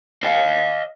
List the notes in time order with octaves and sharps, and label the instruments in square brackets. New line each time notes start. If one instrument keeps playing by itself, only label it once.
[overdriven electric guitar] D#5 F5